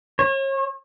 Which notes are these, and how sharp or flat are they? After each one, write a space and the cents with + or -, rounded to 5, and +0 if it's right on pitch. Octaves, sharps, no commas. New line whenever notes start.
C#5 -40